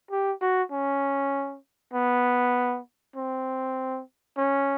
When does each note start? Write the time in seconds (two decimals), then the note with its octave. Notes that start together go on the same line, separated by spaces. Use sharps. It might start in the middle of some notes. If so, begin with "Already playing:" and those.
0.11 G4
0.41 F#4
0.72 C#4
1.94 B3
3.16 C4
4.37 C#4